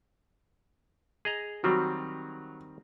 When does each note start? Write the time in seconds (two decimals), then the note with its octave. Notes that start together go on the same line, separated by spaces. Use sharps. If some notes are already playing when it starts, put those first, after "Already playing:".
1.25 G#4 D#5 A#5
1.64 D#3 F#3 G3 C4